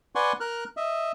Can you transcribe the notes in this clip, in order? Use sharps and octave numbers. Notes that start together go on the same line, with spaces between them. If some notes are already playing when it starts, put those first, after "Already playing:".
B4 D5 F#5 G#5 C6 C#6
A#4 F6 F#6
D#5 E5